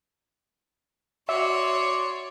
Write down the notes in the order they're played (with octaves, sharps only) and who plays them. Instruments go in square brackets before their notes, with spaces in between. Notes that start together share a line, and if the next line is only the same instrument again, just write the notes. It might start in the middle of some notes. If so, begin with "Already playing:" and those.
[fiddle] F#4 [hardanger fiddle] C#5 [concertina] D5 C6 D6 [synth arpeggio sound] E5